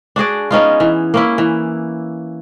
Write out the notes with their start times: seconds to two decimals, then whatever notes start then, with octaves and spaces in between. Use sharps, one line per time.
0.16 D4 F#4 G#4 D5
0.51 B3 C#4 D#4 F4
0.80 E3
1.14 A#3 C#4 E4
1.38 E3